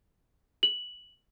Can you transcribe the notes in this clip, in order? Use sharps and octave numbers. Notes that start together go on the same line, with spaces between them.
F#7